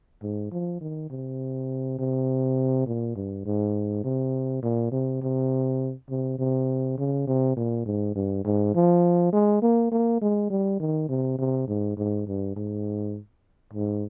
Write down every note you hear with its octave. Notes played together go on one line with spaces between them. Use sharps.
G#2
F3
D#3
C3
C3
A#2
G2
G#2
C3
A#2
C3
C3
C3
C3
C#3
C3
A#2
G#2
G2
G#2
F3
G#3
A#3
A#3
G#3
G3
D#3
C3
C3
G#2
G#2
G2
G#2
G#2